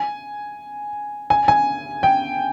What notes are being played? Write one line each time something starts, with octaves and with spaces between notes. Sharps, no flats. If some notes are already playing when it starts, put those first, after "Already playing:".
Already playing: G#5
G#5
G#5
G5